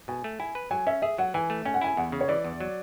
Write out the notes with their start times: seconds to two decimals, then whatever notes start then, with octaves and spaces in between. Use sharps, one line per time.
0.08 B2 G#5
0.24 A3
0.40 E4 G#5
0.55 B4
0.71 F#3 G#5
0.87 C#4 E5
1.02 G#4 E5
1.18 F#3 F#5
1.34 E3 G#5
1.50 A3
1.65 C#4 G#5
1.74 F#5
1.81 E4 G#5
1.97 E2 F#5
2.12 C#3
2.21 C#5
2.28 E3 D5
2.44 E2
2.61 F#3